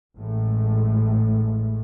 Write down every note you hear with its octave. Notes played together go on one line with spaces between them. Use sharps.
A1 A2 G#3 A3